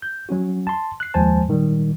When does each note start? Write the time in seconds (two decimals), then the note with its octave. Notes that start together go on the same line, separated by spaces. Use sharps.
0.02 G6
0.29 F#3 C#4 F#4
0.67 A5 C6
1.00 F#6 C7
1.14 D#2 F3 G#3 C5 G#5 A5
1.48 A#2 D#3 G3